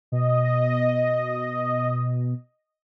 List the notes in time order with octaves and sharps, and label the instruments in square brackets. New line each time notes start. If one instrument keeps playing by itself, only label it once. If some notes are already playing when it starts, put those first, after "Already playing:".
[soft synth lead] B2 [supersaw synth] D#5